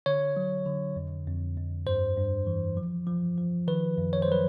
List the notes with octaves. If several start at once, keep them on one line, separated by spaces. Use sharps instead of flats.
D3 C#5
F#3
D3
F2
F2
F2
G2 C5
G2
E3
F3
F3
F3
D#3 B4
F#2
C#5
C5
F#3 B4